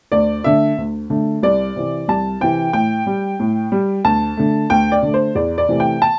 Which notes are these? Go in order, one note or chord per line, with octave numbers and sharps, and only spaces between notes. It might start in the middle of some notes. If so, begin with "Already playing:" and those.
D2 D5
D3 A3 E5
D2
D3 A3
C2 D5
C3 E3
C2 A5
C3 E3 G5
A2 G5
G3
A2
G3
D2 A5
D3 A3
D2 G5
D5
D3 A3
C5
E2 D5
D5
C3 E3 A3
G5
A5